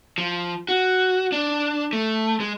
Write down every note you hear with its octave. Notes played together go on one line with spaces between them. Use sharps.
F3
F#4
D4
A3
G#3